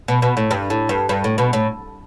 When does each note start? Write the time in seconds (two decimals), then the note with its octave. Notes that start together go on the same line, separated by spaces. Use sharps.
0.08 B2
0.22 B2
0.37 A2
0.51 G2
0.70 A2
0.89 G2
1.09 G2
1.24 A2
1.38 B2
1.53 A2